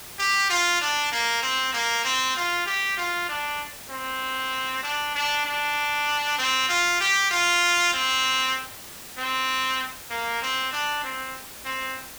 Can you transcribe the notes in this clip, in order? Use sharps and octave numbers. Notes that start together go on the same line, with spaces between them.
G4
F4
D4
A#3
C4
A#3
C4
F4
G4
F4
D4
C4
D4
D4
D4
C4
F4
G4
F4
C4
C4
A#3
C4
D4
C4
C4